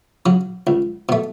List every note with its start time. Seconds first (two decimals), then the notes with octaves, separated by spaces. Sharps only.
0.26 C#3 F#3
0.67 C#2
1.09 B2 A3